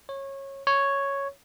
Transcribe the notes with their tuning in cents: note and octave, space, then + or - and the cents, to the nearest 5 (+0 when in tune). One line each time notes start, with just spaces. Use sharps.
C#5 -20
C#5 +0